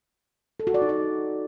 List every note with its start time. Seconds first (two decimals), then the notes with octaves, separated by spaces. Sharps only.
0.60 A4
0.67 F#4
0.74 D5
0.82 D#4
0.89 D5